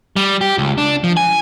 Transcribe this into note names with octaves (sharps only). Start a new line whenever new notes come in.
G3
G4
C#2
D4
F3
G#5